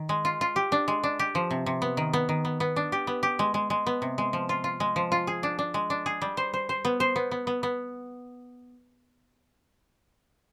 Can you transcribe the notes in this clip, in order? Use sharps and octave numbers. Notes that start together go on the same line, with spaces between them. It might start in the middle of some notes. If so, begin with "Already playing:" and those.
Already playing: D#3
G#3
F4
F4
G4
D4
G#3
D4
G4
F3
C3
C3
B3
D#3
B3
D#3
B3
B3
D4
G4
B3
G4
G#3
G#3
G#3
B3
C3
G#3
F3
F4
F4
G#3
F3
F4
G#4
D4
D4
G#3
D4
G#4
G3
C5
C5
C5
B3
C5
B3
B3
B3
B3